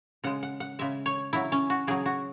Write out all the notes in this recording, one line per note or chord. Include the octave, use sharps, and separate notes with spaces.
C#3 G#3 F#5
F#5
F#5
C#3 G#3 E5
C#5
C#3 F#3 E4
C#4
F#4
C#3 F#3 G#4
F#4